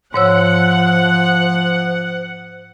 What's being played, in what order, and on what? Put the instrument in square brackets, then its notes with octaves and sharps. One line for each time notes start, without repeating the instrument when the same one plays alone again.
[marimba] G#2 C#5 E6 [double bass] F3 [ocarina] C5 [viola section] F#5